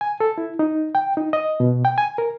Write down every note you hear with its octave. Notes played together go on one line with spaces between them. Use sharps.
G#5
A4
E4
D#4
G5
D#4
D#5
B2
G5
G#5
A#4